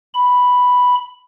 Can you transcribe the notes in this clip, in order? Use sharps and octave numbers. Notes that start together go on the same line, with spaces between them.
B5